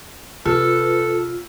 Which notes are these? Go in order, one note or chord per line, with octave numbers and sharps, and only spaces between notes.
C3 F4 A4 B4